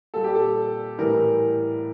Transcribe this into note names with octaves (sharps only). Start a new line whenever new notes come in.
A#2 G3 A4
G4
A4
A2 E3 G3 A#4